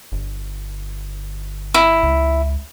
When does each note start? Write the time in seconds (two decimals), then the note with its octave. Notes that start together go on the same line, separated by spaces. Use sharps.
0.12 G1
1.74 E4
2.03 C#2